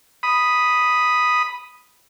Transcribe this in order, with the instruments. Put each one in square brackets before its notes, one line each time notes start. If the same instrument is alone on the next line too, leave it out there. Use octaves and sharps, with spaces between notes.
[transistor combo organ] B5 D#6